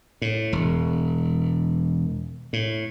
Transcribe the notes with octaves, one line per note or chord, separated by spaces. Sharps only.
A2
E1
A2